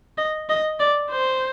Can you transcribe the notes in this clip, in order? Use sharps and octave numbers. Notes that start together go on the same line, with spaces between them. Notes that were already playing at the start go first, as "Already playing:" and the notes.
D#5
D#5
D5
C5